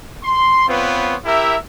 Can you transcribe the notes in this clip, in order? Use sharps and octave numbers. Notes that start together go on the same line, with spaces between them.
C6
B3 C4 F4 B4 C#5
E4 G4 A#4 E5